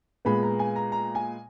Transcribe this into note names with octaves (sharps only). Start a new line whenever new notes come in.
A#2 G#3 B3 B5
A#5
G#5
A#5
A#5
G#5